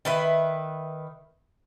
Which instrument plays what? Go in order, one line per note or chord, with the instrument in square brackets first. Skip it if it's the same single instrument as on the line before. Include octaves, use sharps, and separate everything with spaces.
[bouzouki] D#3 B4 E5